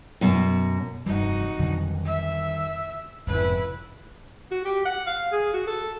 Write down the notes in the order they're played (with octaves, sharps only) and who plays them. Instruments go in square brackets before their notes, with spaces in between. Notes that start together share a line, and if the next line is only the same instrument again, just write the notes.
[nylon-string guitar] F#2 B2
[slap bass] F1 E3 [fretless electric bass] G2 G3 [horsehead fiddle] D#4 F#4
[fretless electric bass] F2 B2 D3 [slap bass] D#3 F#3 G3
[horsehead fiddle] E5
[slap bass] F1 [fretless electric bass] F2 G#2 C#3 [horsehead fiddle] E4 B4
[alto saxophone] F#4
G4
F#5
F5
G#4
F#4
A4